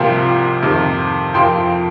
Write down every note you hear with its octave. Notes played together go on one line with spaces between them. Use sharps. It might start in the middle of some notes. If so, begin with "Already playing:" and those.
Already playing: C2 C3 F3 A#3 G5 C6
F2 C3 D#3
F2 F3 A#3 G5 C6